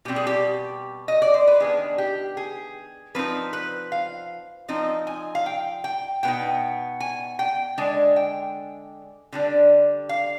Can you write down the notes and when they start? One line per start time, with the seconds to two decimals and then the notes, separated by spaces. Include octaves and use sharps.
0.05 B2 G3 C4 G4
0.16 G#4
0.27 G4
1.08 D#5
1.22 D5
1.34 C5
1.47 B4
1.60 D#3 B3 D4 G#4
1.98 G4
2.37 G#4
3.15 F3 C4 D#4 B4
3.53 B4
3.92 F5
4.68 F3 C4 D#4 D#5
5.07 G#5
5.35 F5
5.46 G5
5.84 G5
6.23 B2 B3 D#4 G5
7.00 G#5
7.39 G5
7.78 D3 G#3 D4 G#5
8.16 G5
9.32 D3 G3 D4
10.09 F5